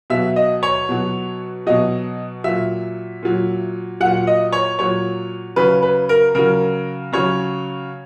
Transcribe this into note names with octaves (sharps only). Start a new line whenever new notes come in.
B2 F#3 E5
D#5
C#5
B2 F#3
B2 F#3 D#5
A#2 F#3 E5
A#2 F#3
A#2 F#3 F#5
D#5
C#5
A#2 F#3 C#5
C#3 F#3 B4
B4
A#4
C#3 F#3 A#4
C#3 F#3 C#5